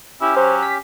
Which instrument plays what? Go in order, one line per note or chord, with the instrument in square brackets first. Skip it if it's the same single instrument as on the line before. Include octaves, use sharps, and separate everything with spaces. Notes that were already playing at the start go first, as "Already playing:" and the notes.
[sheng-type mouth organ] C#4 G4 [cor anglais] E4
[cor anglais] F#3 [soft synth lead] C5
[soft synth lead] B6